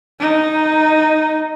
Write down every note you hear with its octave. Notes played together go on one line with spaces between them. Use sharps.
D#4